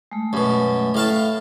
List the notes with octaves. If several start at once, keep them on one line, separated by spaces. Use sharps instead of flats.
G#3 A3
F#2 B2
A2 F5 A5